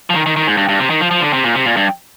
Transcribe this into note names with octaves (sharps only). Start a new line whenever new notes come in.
F3
D#3
D#3
D#3
G#2
G2
G2
C3
D#3
F3
F3
D3
C3
A#2
C3
A#2
G2